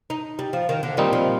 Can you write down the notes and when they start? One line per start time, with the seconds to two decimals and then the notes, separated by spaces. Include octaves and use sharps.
0.10 D#4
0.39 G3
0.53 F3
0.69 D#3
0.83 D3
0.97 A#2 D#3 G3 C4 D#4
1.13 F3